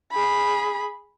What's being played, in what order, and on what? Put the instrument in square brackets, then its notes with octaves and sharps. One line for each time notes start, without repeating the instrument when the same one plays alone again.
[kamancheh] G#4 B5